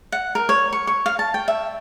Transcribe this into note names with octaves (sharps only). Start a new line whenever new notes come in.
F#5
A#4
C#5
C#6
C#6
F5
A5
G5
E5